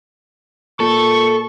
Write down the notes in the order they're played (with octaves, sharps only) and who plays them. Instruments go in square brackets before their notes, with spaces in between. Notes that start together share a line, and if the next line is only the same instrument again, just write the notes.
[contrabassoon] A#2 [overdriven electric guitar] A4 [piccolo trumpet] C#6